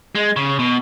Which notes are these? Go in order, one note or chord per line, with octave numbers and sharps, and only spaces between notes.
G#3
C#3
B2